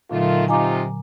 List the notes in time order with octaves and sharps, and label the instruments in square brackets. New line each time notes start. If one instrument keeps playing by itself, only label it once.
[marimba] A#2 D3 F#3 [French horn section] D#3 A3 F4
[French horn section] C3 D#4 F4 [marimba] G#5 A#5 D6